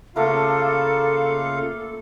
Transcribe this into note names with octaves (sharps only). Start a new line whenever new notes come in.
C#3 A3 A#3 E4 F4 A4 F5